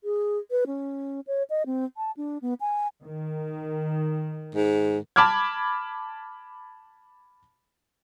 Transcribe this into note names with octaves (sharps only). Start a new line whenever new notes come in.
G#4
B4
C#4
C#5
D#5
C4
A5
D4
B3
G#5
D#3
G#2
A5 B5 D6 F6 G#6